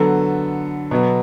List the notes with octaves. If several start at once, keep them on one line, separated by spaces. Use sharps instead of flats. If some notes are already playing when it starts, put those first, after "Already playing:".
Already playing: D3 F#3 B3 A4
B2 F#3 B3